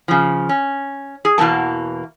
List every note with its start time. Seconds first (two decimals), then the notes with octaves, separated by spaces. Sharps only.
0.08 C#3 F3
0.49 C#4
1.25 G#4
1.38 E2 B2 E3 A#3 A5